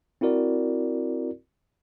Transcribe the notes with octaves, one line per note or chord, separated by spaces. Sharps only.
C4 E4 F#4 A#4 D5